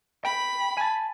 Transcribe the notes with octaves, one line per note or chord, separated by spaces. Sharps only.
G5 B5
G#5 A5